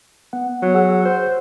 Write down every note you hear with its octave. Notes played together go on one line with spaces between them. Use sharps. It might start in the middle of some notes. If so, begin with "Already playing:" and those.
B3 F#5
F#3
G#4 F#5 E6
C5